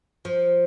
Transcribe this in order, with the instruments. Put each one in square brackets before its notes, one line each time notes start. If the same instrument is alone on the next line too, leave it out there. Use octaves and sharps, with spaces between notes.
[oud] F3